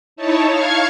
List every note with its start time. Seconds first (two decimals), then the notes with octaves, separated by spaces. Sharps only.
0.16 D#4 E4 C#5 A5
0.49 F5 C#6 F6 G#6